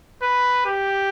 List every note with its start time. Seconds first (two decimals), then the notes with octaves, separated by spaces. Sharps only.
0.22 B4
0.65 G4